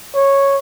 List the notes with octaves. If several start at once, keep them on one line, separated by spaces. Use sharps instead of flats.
C#5